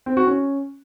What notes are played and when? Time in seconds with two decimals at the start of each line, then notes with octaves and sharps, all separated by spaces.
0.06 C4
0.17 F#4
0.27 C#4